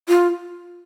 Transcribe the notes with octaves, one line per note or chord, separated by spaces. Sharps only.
F4